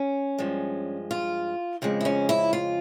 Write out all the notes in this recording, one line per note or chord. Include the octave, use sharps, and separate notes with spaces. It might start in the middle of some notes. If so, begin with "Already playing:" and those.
Already playing: C#4
G2 F3 G#3
F4
F2 C#3 F3 G#3
E4
C#4
E4
F4